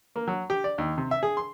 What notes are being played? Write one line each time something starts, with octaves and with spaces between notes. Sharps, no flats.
A#3
F#3
G4
D5
D#2
C3
E5
G#4
C6